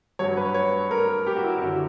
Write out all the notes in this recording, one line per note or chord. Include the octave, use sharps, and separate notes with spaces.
G2 F#3 C#5
B4
C#5
A#4
G4
F#4
E4
F#2 D3 F#3 F#4